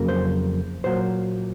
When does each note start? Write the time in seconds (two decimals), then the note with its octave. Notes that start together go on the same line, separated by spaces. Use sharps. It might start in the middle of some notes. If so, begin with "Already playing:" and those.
Already playing: F2 C#3 F#3 A#3
0.08 C5
0.84 A#2 F#3 A#3 C5